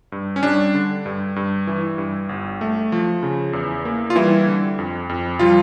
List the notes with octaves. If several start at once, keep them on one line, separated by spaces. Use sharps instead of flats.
G2
C#4
G3 D4
D3
G2
G2
E3
G2
G1
A3
F3
C#3
E2
A#3
F4
E3 G3 E4
D3
F2
F2
F3 G3 F4